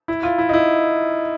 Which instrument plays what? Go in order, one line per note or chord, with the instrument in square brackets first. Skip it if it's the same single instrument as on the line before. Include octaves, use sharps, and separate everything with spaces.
[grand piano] E4
F4
E4
D#4
E4